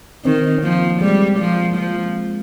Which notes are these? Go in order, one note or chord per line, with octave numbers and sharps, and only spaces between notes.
D#3 C4
C4
F3 A#3
G3 G#3
F3
F3